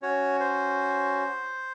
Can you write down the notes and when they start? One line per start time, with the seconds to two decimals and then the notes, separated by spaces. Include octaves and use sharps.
0.02 C#4 F#4 C#5
0.40 C5